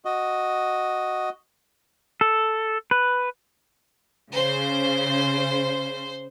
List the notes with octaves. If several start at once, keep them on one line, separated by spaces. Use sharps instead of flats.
F#4 D#5
A4
B4
C#3 C5